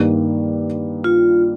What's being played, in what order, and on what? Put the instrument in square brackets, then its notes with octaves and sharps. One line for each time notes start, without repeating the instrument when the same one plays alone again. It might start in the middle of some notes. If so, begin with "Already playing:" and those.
Already playing: [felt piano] G2 D#3 A#3
[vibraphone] F4